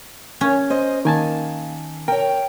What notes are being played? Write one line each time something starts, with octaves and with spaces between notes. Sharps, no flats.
C#4
C5 D#5
D#3 A#3 G#5 A5
A#4 C#5 G5